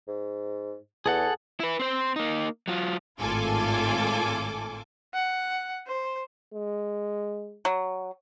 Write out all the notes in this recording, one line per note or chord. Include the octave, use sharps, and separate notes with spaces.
G#2
E2 G#4 A4 F#5
E4 B4
C4 C5
A#3 D#4
F#3 F4
G#1 A2 F4 A4 G#5 D6
F#5
C5
G#3
F#3